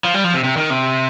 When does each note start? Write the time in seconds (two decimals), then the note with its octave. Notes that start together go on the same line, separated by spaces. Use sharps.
0.04 F3
0.14 G3
0.24 F3
0.34 C3
0.44 C3
0.57 D#3
0.70 C3